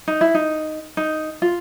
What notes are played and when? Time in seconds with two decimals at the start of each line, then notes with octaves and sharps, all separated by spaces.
0.08 D#4
0.21 E4
0.34 D#4
0.97 D#4
1.42 F4